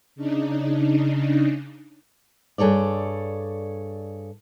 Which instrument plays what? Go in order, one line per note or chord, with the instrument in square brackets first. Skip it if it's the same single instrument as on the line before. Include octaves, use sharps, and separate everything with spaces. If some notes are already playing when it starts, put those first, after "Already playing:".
[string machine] C#3 D4 D#4
[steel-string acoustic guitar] G2 G#4 A4 C#5 D5